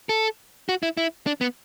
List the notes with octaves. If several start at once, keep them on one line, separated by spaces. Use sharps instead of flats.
A4
F#4
E4
E4
D4
B3